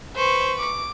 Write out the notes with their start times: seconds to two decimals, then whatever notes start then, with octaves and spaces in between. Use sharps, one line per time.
0.16 B4 C5 C#6
0.58 D6